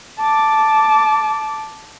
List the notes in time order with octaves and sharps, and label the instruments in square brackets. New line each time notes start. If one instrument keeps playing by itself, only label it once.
[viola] A5 D6